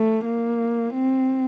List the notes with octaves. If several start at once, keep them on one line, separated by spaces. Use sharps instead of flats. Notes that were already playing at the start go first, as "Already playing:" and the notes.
Already playing: A3
A#3
C4